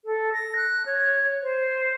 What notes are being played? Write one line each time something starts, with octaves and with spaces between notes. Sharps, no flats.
A4
A#6
F#6
C#5
C5